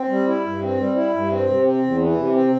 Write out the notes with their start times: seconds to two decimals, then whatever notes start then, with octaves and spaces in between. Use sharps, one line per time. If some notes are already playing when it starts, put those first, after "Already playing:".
Already playing: C4
0.09 G3
0.27 E4
0.44 G2
0.61 C4
0.79 G3
0.96 E4
1.13 G2
1.31 C4
1.48 C3
1.65 C4
1.83 E2
2.00 E3
2.17 C3
2.35 C4